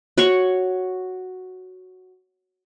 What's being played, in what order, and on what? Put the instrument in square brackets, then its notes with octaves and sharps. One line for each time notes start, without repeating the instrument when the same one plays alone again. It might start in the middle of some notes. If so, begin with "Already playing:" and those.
[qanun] F#4 C#5 F#5 C#6